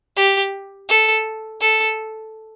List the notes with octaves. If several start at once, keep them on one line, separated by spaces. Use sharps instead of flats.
G4
A4
A4